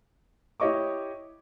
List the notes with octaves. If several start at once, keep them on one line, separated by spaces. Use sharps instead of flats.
E4 G4 C#5 D#5 C#6 D6